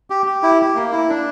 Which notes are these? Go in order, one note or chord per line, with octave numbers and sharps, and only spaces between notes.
G4
G4
E4
G4
A#3
E4
D4